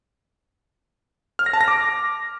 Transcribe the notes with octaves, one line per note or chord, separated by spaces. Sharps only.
F6
A#6
A5
A#6
D6